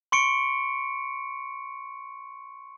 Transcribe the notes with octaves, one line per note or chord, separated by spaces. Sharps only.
C6 C#6 C#7 D7